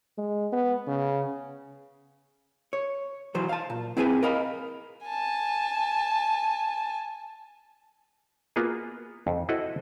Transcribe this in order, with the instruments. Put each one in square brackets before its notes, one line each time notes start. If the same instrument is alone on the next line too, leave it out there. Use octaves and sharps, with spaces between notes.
[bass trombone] G#3
B3
C#3
[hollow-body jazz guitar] C#5
B1 E3 F#3 C5
F5 A5
A#2
C4 E4 G#4 B4 G5 G#5
A#4 D#5 F5 B5
[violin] G#5 A5
[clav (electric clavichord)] A#3 B3 F4 F#4 G#4
F2
E4 F#4 A4 C5 D#5 F#5